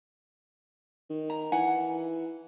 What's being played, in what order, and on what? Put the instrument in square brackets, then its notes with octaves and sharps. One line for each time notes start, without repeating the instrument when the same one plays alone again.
[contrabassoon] D#3
[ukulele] A#5
[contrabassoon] E3 [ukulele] F#5 G#5